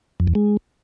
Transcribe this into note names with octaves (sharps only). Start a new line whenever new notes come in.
F2
E2
G#3